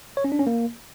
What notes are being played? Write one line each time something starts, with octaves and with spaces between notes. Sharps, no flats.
C#5
C#4
D4
C#4
A#3